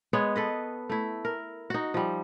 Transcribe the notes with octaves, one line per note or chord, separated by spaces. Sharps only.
G#3 B3 C#5
A4 B4 D#5
A3 E4
A#4
D#4 F#4
F3 G3